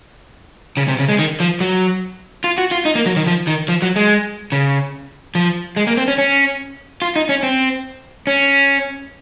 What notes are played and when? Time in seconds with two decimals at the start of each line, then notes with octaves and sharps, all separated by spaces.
0.77 C#3
0.88 C3
0.99 C#3
1.09 G#3
1.19 D#3
1.40 F3
1.60 F#3
2.44 F4
2.58 F#4
2.71 F4
2.85 D#4
2.95 A#3
3.06 F#3
3.16 D#3
3.26 F3
3.47 D#3
3.68 F3
3.82 F#3
3.96 G#3
4.52 C#3
5.35 F3
5.76 G#3
5.87 A#3
5.97 C4
6.08 C#4
6.18 C#4
7.02 F4
7.16 D#4
7.29 C#4
7.43 C4
8.27 C#4